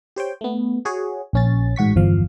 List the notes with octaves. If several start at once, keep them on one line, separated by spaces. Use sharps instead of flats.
G4 C5 C#5 G5
A3 B3
F#4 G#4 C#5
A#1 C#4 A6
A1 G#2 F#4 C#6 B6
G1 E2 F3 F5